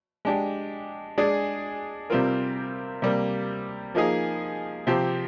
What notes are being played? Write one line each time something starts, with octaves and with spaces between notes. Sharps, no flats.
G#3 D4 G4
G#3 D4 G#4 D5
C3 G3 C4 F4 A#4
C3 G3 A#3
F3 A#3 D#4 G#4
C3 F3 C4 G4